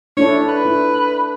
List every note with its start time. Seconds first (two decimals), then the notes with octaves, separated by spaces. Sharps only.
0.17 D4 E4 A4 C#5
0.48 B4
0.65 E4